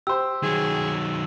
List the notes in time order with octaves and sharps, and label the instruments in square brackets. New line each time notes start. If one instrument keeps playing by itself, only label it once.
[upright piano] G4 C5 [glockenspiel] E6
[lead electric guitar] D#3 F#3 [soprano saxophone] G#4